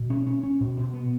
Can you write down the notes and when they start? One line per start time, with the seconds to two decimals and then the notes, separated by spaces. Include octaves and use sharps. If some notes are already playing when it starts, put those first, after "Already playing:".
Already playing: B2
0.10 C#4
0.27 C#4
0.43 C#4
0.61 B2
0.77 B2
0.94 B3